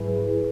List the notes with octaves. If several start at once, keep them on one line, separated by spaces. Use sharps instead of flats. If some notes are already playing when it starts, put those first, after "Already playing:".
Already playing: G#2 F#3 E4 G#4 B4